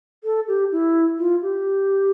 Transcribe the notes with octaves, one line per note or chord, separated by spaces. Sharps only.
A4
G4
E4
F4
G4